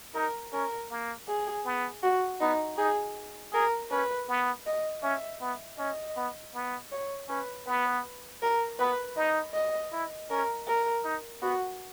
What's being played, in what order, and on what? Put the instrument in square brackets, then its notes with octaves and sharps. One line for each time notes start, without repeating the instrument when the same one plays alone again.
[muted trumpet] D#4 [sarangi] A#4
[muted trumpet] C#4 [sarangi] A#4
[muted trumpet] A#3
[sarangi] G#4
[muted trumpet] B3
[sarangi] F#4
[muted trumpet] B3 [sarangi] D#4
[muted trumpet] D#4 [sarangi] G#4
[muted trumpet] G#4 [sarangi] A#4
[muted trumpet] C#4 [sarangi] B4
[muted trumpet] B3
[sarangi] D#5
[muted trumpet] C#4 [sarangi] E5
[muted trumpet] B3
[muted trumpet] C#4 [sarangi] D#5
[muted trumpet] B3
B3
[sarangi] C#5
[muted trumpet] C#4 [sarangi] B4
[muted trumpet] B3 [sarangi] B4
[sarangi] A#4
[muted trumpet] B3 [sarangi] B4
[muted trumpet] D#4 [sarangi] D#5
[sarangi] D#5
[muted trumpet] E4
[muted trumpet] C#4 [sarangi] A#4
[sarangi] A#4
[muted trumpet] D#4
[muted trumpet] B3 [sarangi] F#4